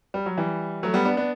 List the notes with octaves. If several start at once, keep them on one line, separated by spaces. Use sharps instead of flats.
G3
F#3
E3 G3
F#3 A3
G3 B3
B3 D4
B3 D4